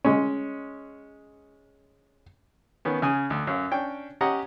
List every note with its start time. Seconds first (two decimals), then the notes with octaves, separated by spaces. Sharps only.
0.05 G#3 C#4
2.85 D#3 B3 C#4
3.02 C#3 G#5 D#6
3.30 D2
3.47 F#2 C#4 F5
3.71 C#4 D4 G5
4.21 C#4 G4 D#5 F#5 A#5